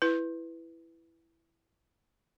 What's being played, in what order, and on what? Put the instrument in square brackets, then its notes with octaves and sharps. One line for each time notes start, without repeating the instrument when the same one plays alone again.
[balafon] E4 B4